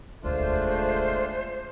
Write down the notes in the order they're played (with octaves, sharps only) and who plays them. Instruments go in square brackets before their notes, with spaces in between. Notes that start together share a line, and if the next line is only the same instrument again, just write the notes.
[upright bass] E1 D2 [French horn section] G#3 A3 [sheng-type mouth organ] D4 F4 [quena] C5